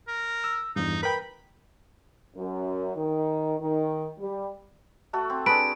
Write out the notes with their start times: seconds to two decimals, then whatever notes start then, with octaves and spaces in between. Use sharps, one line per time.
0.08 A#4
0.44 E6
0.76 E2 G2 D#4
1.03 A#4 B4 G5 B5
2.36 F#2
2.96 D#3
3.60 D#3
4.20 G3
5.13 A3 F#4 A4
5.30 C4
5.46 D4 G#4 B4 A5 D7